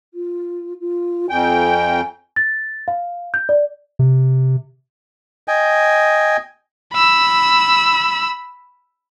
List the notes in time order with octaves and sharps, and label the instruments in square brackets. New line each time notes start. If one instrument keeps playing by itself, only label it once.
[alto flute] F4
F4
[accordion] F2 G5 [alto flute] G#5
[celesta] A6
F5
G6
D5
[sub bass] C3
[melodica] D#5 G5 G#5
[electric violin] B5 E6